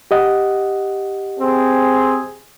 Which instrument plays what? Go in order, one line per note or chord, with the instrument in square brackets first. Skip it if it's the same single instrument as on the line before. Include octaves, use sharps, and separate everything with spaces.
[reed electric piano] G4 D#5 F#5
[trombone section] C4 G#4